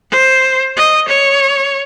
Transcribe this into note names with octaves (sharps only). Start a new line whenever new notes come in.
C5
D#5
C#5